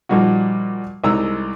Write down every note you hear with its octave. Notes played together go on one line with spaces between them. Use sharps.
A#2 F3 G3 D#4 F#4
C2 G3 G#3 D#4 A#5 E6